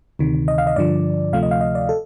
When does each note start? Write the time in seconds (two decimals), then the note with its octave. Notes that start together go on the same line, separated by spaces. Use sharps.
0.19 D2 C3 D#3
0.48 D#5
0.58 F5
0.67 D#5
0.76 G2 D3 F3 D5
1.33 D2 C3 F3 A3 F5
1.43 D#5
1.51 F5
1.61 D#5
1.75 D5
1.89 A4